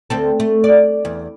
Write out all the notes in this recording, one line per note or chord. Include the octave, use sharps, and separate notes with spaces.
D2 C4 A4
A3
D5
E2